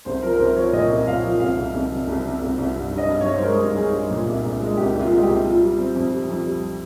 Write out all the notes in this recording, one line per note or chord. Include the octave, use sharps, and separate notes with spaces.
C2 C5
F3 A#4
A#4
C2 C5
F3 C#5
A#2 D#5
C2
A#2 F5
F3
C2 F5
C2
C2
C3
C2
C3
C2
C2
G2
G2
D#5
G2
G2 C#5
C5
G#3 A#4
G2
G2 G#4
G2
A#2
C2
C2
G#3
C2 G4
C2
F4
G#3
C2 G4
G3 F4
G3
C4
F2
G3
F2
G3